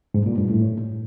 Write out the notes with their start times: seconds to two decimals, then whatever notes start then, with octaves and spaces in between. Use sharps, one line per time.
0.14 G#2
0.26 A#2
0.38 G2
0.50 A2